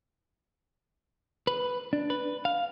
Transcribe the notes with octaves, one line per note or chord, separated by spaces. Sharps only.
B4
D4
B4
F5